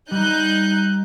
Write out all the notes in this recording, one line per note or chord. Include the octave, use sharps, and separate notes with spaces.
G3 D#4 F#6 G6